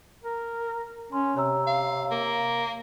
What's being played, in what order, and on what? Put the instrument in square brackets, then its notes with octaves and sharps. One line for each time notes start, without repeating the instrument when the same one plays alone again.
[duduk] A#4
[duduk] C#4 [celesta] C6
[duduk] C3 [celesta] C#5 A#5 E6
[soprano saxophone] F5
A#3